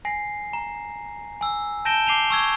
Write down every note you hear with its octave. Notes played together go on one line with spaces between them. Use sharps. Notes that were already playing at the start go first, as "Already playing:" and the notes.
G#5 A#6 C7
A#5
G#5 E6
A5 G6 A#6 D7 E7 G7
D6 C7 D#7 F7 G7
C#6 E6 G#6